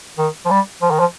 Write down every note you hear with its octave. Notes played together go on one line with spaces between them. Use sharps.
D#3
F3
G3
F3
D#3
F3